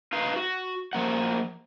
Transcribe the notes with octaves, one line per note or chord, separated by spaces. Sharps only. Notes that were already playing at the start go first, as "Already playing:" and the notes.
D#4 B4 F5
F#4
F3 A#3 F#5